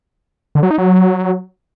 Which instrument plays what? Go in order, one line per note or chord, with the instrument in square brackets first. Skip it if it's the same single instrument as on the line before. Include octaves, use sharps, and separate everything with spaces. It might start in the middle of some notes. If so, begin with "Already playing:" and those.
[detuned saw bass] D3
F#3
D#4
F#3